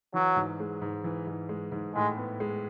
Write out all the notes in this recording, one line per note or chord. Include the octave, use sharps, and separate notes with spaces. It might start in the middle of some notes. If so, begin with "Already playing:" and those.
E3 F#3
G#2
G#3
G#2
E3
G#2
G#3
G#2
A2 G#3
B3
G#3